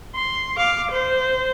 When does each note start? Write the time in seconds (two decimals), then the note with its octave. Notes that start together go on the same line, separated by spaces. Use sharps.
0.15 C6
0.57 F5 D6
0.91 C5